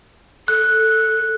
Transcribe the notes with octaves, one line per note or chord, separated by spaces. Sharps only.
A4 F#6